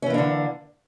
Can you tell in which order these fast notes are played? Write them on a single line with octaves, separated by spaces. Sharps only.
C#4 E3 A#3 D4 D3